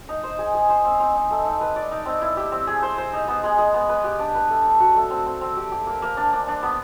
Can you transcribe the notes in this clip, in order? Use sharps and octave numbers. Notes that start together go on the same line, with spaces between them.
D#4
C5
G#4
G#4
C5
C4
C4
D#4
A3
D#4
B4
D5
D#4
C4
E4
G4
C4
G#4
C5
C5
D#4
B3
G#3
G#3
B3
B4
G4
D4
B4
A3
D4
F#4
A3
C4
C4
C4
G4
G4
A#3
A#3
D4
D4
D4
B3